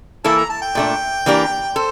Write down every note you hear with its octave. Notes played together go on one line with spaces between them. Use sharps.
E3 A#3 E4 A4 A5
A#5
A5
G5
A#2 A3 D4
E3 A#3 D4 G4 A#4
A4 C5